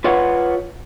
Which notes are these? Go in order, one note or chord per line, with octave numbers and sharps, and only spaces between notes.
F4 B4 C#5 F#5